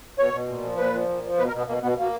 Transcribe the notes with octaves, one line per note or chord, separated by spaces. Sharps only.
B2 C#5
B2
A#2
F3
A#2 B4
F3
A#2
F3
B2 B4
A#4
B2 B3
B2 A#3
B2 B3
B2 A#3